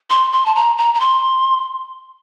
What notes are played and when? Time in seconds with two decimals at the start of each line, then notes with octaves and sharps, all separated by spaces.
0.10 C6
0.32 C6
0.46 A5
0.55 A#5
0.78 A#5
0.94 A#5
1.00 C6